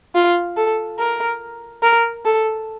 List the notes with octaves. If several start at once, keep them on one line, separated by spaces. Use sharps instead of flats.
F4
A4
A#4
A#4
A4